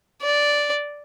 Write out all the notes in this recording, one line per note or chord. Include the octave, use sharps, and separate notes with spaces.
D5